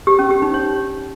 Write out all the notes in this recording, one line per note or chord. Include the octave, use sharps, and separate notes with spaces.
G4
C#4
G4
D#4
C#5